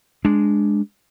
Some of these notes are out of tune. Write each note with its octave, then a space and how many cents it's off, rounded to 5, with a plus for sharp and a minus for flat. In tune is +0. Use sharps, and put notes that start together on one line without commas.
G#3 +0 D4 +0